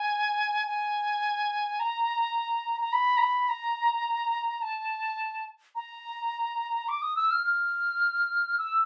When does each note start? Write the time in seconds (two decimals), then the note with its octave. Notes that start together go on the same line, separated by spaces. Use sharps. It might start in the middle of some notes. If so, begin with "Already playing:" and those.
Already playing: G#5
0.67 G#5
1.80 A#5
2.81 A#5
2.93 B5
3.17 A#5
3.21 B5
3.49 A#5
4.62 A5
5.75 A#5
6.88 D6
7.02 D#6
7.16 E6
7.31 F6
7.45 F6
8.58 E6